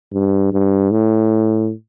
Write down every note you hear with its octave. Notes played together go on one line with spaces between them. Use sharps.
G2
G2
A2